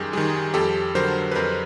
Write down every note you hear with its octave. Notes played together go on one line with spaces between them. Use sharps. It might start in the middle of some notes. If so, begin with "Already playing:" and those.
Already playing: F#2 D#3 G3 G4 G#4
D#3 G3 G#4
F2 G4 A4
D3 F#3 A#4 C5
B4
F2 A#4 C5